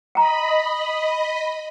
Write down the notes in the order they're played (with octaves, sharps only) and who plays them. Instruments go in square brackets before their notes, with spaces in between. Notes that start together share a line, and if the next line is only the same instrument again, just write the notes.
[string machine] D#5 B5 [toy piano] G5 A#5